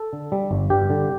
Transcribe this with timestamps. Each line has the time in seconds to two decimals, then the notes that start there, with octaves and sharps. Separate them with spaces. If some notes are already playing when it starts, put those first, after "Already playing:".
Already playing: A4
0.13 D3
0.32 G3
0.51 G1
0.70 G2 G4
0.90 D3